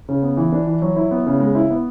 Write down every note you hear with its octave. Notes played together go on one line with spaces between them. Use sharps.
C#3
B3
E3
D4
E3
F#3
E4
B3
C#3
G#3
E4
B3